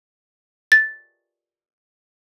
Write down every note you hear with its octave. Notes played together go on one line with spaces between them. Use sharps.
A6